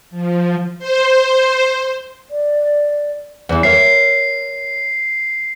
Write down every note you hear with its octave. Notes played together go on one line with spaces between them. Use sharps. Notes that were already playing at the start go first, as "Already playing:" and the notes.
F3
C5
D5
E2 E3
A#4 C#5 E5 C7